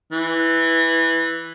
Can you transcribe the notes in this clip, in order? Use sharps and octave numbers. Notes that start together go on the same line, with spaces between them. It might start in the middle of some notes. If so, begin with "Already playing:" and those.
E3